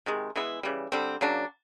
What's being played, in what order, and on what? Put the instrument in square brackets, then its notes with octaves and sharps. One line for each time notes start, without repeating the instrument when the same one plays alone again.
[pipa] C3 D#3 G#3
E3 G#3 B3 E4
C#3 E3 G3
D3 G3 C4
C#3 F#3 A#3 D4